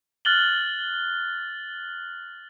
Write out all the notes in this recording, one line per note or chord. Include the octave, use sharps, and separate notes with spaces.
F6 F#6 A6 F#7 G7